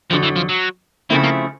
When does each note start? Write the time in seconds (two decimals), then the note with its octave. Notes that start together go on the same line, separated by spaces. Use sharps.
0.11 F2 D3 F3 F#3
0.23 E3
0.36 F3
0.49 F#3
1.10 C#3 F3 A3 A#3 C4 E4
1.24 A#3